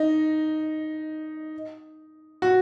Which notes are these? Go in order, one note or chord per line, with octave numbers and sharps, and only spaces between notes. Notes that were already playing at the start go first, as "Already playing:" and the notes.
Already playing: D#4
F#4